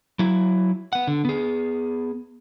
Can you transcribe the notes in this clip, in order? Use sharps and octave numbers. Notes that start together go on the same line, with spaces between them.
F#3 E4
B3 F#5
D3
B3 G#4